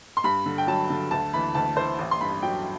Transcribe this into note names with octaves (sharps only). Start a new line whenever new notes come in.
C6
G2 B5
D3
G5
F#3 A5
D3
D2 A5
E3 B5
D2 A5
E3 C5
A1
C6
G2 B5
F#3 G5